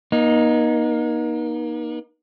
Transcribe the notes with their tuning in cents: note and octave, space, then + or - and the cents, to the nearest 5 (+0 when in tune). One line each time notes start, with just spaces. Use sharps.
A#3 +40 D#4 +0